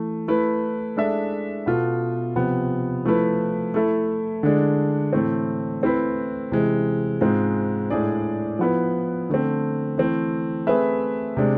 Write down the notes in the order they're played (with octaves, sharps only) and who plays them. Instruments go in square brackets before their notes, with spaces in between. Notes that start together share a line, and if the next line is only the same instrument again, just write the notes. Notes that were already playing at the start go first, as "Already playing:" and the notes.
Already playing: [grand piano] E3 A3
A3 E4 B4
G#3 D4 A4 E5
B2 B3 F4 A4
C3 F3 B3
F3 A3 E4 B4
A3 E4 A4 E5
D3 G#3 D4
A2 E3 A3 C4
A3 C4 E4 B4
C3 E3 G#3
G#2 G#3 C4 F4
A2 G#3 D4 G#4 D5
F3 B3 E4 B4
D3 A3 C4
E3 A3 C4
A3 C4 G#4 B4 E5
C3 G#3 D4